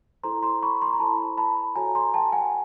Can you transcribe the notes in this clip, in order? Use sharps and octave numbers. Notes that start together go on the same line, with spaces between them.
E4 A4 C5 A#5 C6
A#5 C6
B5 C#6
A#5 C6
A#5
E4 A4 C5 A5 B5
A5 B5
F#4 A4 C#5 G#5 A#5
A#5 C6
G5 A5
F#5 G#5